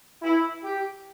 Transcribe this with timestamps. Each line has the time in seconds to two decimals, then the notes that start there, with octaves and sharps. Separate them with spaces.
0.22 E4
0.64 G4